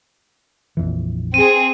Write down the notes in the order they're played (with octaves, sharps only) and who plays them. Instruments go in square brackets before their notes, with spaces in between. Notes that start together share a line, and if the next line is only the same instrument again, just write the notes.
[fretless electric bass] A#1 F2 E3
[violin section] C4 G#4 [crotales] D#7